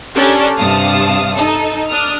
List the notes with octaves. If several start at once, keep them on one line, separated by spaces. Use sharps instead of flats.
C#4 D4 G4 A4 A#4 D5
G2 C3 F5 A5 D#6
D#4 A4
D4 D#6 F6